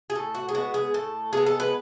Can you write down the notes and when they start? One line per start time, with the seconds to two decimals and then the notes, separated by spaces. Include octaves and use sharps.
0.10 G#4
0.15 A2 A4
0.35 F#4
0.49 G#4
0.54 G#3 B3 F#4
0.74 G#4
0.94 A2 A4
1.33 G#3 B3 G#4
1.46 A4
1.60 B4